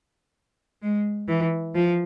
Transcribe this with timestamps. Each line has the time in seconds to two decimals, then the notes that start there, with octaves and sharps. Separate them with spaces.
0.82 G#3
1.29 E3
1.75 F3